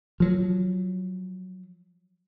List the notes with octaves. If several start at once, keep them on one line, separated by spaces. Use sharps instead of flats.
F3 F#3